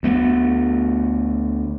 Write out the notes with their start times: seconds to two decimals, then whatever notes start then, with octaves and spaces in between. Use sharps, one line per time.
0.03 D2 A3 B3